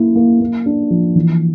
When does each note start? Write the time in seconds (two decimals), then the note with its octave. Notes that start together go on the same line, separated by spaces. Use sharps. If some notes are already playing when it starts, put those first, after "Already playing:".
Already playing: A#3 E4
0.16 A#3
0.41 A#3
0.66 D4
0.90 F3
1.16 E3